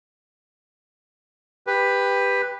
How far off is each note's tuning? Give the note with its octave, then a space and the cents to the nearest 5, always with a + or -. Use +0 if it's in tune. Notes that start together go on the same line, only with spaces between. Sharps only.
G4 +15 B4 +0